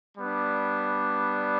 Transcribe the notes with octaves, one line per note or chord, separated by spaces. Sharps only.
G3 B3 D4